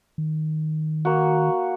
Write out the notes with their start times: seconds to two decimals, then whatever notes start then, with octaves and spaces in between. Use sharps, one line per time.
0.18 D#3
1.05 A#3 F#4